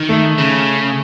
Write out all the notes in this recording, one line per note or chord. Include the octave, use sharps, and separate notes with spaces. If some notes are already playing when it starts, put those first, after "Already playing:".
Already playing: D#3
A3
C#3